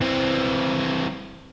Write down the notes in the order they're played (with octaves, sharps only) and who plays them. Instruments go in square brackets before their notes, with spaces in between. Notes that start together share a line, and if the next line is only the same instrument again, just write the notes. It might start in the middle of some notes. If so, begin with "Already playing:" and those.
[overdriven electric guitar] E3 C4